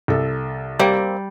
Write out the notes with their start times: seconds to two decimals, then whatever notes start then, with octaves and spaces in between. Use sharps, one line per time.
0.08 C2 A4
0.79 G3 A#3 C4